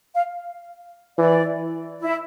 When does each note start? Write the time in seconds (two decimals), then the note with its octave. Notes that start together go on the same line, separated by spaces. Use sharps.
0.15 F5
1.18 E3 D5
2.02 E4